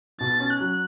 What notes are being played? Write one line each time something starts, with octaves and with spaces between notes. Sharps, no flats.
B2 A6
C#4
F#6
F#3